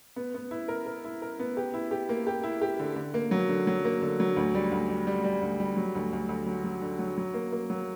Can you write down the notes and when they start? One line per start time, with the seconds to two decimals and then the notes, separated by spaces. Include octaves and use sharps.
0.16 B3
0.34 B3
0.51 E4
0.68 A#4
0.86 A#4
1.04 E4
1.22 A#4
1.40 B3
1.57 G4
1.74 E4
1.91 G4
2.09 A#3
2.27 G4
2.43 E4
2.61 G4
2.80 D3
2.96 D3
3.14 A#3
3.31 F#3
3.49 D3
3.67 F#3
3.85 A#3
4.02 D3
4.20 F#3
4.36 D2
4.55 G3
4.71 D2
4.89 G3
5.07 G3
5.24 G3
5.42 D2
5.60 G3
5.77 F#3
5.95 D2
6.12 D2
6.29 D2
6.46 F#3
6.64 F#3
6.81 D3
6.99 F#3
7.18 F#3
7.34 A#3
7.52 A#3
7.70 F#3